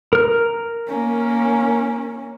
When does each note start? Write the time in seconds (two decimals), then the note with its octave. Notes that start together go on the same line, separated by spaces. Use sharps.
0.13 A#4 F6
0.88 A#3 C#4